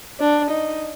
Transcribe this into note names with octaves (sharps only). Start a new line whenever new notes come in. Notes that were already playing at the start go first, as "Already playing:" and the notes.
D4
D#4